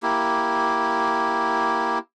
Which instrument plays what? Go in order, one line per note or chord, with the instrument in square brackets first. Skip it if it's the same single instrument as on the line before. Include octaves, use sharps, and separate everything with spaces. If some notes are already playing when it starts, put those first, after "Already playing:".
[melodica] A#3 E4 G4